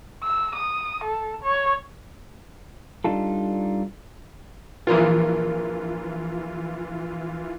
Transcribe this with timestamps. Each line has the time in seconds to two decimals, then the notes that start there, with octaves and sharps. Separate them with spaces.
0.24 E6
0.55 D#6
1.04 A4
1.43 C#5
3.04 G3 D4 D#4 F4 A4
4.87 A#1 E3 A#3 F4 D#6